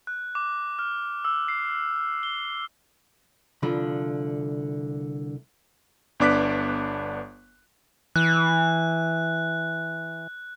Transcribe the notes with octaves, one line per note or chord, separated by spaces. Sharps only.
F#6
D6
F6
E6
C7
G7
C2 D3 F3 B5
G1 B3 D4 D6 F#6 B6
E3 F#6